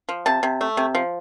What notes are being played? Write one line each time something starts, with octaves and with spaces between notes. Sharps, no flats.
F3
C3 A5
C3
A3
C3
F3